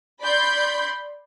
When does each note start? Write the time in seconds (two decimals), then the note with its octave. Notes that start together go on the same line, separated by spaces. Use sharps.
0.21 D5 B5 C6 G6